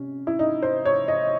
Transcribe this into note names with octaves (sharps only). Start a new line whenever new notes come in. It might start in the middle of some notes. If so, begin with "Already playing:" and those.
Already playing: C3 C#4
E4
D#4
C5
C#5
D#5